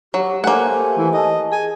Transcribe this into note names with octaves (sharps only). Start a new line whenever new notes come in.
F#3 G4
A3 A#3 G4 C5 F#5 G#5 C6
E3
D#5 A5
G#4 G#5